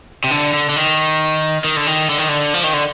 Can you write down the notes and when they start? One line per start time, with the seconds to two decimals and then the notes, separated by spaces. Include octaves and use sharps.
0.24 C3
0.31 D3
0.53 D3
0.69 D3
0.76 D#3
1.64 D#3
1.76 D3
1.87 D#3
2.10 D3
2.18 D#3
2.29 D3
2.54 F3
2.64 D#3
2.73 D3